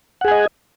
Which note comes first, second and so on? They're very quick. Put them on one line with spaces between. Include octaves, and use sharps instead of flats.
F#5 G#4 G#5 D#5